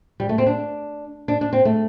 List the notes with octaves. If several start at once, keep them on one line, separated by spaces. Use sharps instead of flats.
G3
A3
C4
D4
D4
D4
C4
A3